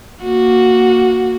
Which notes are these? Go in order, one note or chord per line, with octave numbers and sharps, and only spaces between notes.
A#3 F#4